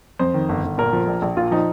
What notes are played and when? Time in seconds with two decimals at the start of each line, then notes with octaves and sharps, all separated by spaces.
0.19 F2 C5
0.34 D#3
0.49 G1
0.64 G1
0.78 A#2 A#4
0.93 F3
1.08 A#1
1.22 A#1
1.37 A#2 F4
1.51 F3 D#4